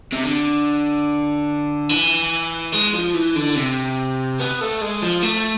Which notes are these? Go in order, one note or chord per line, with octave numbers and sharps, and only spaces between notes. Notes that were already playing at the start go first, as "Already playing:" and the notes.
C3
D3
E3
G#3
F3
E3
D3
C3
B3
A3
G#3
F3
A3